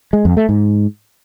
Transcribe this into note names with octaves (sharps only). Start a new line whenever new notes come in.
G#3
F2
A3
G#2